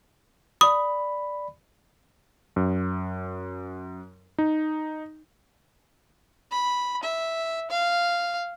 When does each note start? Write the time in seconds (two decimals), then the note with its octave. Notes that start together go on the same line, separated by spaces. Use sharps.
0.61 D5 B5 D#6
2.56 F#2
4.38 D#4
6.52 B5
7.03 E5
7.70 F5